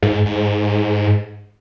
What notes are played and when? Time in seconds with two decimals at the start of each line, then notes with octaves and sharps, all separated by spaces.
0.02 G#2
0.26 G#2